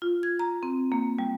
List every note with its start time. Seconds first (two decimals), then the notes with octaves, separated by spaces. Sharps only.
0.02 F4
0.23 G#6
0.39 A#5
0.63 C4
0.92 A#3
1.19 G3